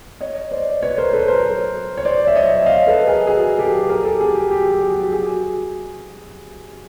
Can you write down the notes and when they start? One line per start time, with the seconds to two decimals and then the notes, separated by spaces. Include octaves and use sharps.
0.21 C#5 D#5
0.51 C5 D5
0.82 B4 C#5
0.98 A#4 C5
1.13 A4 B4
1.28 A#4 C5
1.97 C#5
2.05 C5 D5
2.27 E5
2.35 C#5 D#5
2.61 E5
2.66 D#5 F5
2.87 A4 B4
3.07 G#4 A#4
3.27 F#4 G#4
3.58 G4 A4
3.89 G#4 A#4
4.04 G4 A4
4.21 F#4 G#4
4.35 G4
4.51 G4
4.71 F#4 G#4
4.92 F#4
5.04 G4
5.12 F#4 G#4